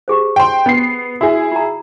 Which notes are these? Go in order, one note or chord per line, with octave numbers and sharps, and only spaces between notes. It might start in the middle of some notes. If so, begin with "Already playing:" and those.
G4 G#4 C5
G5 C6
B3 C7
E4 F#4 G#4
F4 A#5